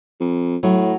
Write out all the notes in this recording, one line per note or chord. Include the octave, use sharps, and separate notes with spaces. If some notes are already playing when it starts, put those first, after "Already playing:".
F2
A2 F#3